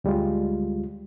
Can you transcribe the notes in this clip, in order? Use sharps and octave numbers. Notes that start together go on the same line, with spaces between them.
D2 G3 G#3 F4